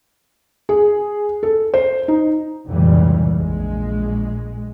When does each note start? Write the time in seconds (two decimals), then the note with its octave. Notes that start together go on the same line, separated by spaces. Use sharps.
0.69 G#4
1.43 A4
1.74 C5
2.08 D#4
2.66 F1 C#2 G2 A#2 E3 G3
3.34 A#1 G#3